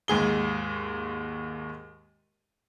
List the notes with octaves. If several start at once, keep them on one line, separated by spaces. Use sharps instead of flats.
D#2 G#2 G#4 G7